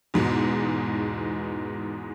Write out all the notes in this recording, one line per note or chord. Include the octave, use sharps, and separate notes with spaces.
E2 G#2 B2